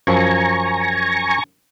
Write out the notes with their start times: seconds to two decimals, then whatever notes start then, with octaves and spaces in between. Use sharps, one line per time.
0.07 F#2 F3 G#5 A#5 C#6